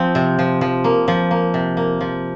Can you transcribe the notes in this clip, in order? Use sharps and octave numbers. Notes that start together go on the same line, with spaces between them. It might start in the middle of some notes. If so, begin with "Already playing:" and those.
Already playing: F3 C4
C3
F3
F3
A#3
F3
A#3
C3
A#3
F3